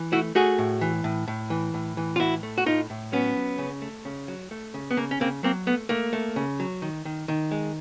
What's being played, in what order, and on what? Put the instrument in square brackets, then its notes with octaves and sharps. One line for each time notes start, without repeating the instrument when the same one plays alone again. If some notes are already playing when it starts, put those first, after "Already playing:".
Already playing: [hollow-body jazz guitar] E3
A3 E4 F#4
A3 F#4 G#4
A2
E3
A2
A2
E3
A2
E3
F4
A2 E4 F#4
A3
F#4
A2 D#4 F4
A2
F#3 B3 C#4
F#3
C#3
A3
C#3
F#3
A3
C#3
B3
C#3 A#3
C#4
C#3 A#3 C4
F#3 A#3 C4
A3 B3
A3 A#3
A3
C#3
F#3
D#3
D#3
D#3
G#3